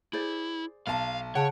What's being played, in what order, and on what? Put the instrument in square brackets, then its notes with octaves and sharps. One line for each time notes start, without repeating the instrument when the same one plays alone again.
[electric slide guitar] E4 [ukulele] G#4 C5 D5
[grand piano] B1 A5 [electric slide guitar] F5
[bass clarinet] C#3 [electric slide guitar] C#5 [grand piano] F#5 [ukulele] G5 A5